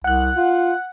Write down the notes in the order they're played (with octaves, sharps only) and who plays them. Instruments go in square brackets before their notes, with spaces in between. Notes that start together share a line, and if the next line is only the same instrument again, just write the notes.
[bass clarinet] C2 [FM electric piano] F#5 F#6
[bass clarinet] F4